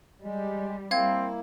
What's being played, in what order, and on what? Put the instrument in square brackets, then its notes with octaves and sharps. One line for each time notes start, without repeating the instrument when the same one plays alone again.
[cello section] G3 [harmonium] G#3
[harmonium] A#3 E4 [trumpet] C4 [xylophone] F5 G#6